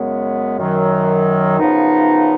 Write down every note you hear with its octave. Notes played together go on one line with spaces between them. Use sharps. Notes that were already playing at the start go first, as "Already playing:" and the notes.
Already playing: F#2 C#3 G#3 B3
F#2 D#3 F#3
F#2 C#3 F3 B3 D#4